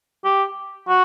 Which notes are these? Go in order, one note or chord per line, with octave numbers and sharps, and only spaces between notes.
G4
F#4